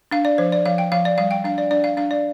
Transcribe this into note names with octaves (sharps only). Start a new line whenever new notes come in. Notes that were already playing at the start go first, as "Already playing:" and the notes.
D4 F5
D5
F3 C5
D5
F3 F5
G5
F3 F5
D5
G3 F5
G5
D4 F5
D5
D4 D5
F5
D4 F5
D5